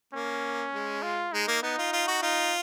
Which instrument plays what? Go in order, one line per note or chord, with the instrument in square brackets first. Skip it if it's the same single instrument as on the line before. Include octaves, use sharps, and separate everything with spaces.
[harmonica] A#3 [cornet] C#4
[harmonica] G#3
[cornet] F4
[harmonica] G#3 [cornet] D#4
[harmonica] A#3
[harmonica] B3 [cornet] D#4
[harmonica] F4
F4
F#4
[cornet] D#4 [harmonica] F4